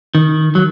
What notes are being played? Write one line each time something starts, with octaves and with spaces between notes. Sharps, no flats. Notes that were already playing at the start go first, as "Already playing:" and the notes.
D#3
F#3